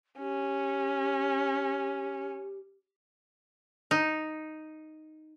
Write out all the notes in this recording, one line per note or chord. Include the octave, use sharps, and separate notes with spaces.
C#4 G4
D#4